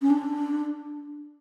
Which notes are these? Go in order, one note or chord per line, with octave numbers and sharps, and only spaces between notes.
C#4
D4